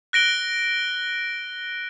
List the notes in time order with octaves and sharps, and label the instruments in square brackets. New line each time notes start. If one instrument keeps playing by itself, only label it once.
[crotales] F#6 A#6 D7 G7